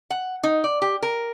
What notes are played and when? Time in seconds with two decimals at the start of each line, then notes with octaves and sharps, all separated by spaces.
0.10 F#5
0.43 D#4
0.64 D5
0.82 G4
1.03 A#4